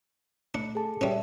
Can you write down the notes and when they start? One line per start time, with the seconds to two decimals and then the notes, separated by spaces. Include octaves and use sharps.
0.54 A3 D4 C#7
0.75 G#4 A4 A5
1.01 G3 C#4 B4 D5 E5